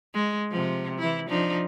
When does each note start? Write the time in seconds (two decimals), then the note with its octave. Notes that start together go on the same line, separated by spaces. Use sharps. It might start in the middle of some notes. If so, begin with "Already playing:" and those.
0.14 G#3
0.51 C3 F3
0.99 E3 E4
1.29 F3 D4 D#4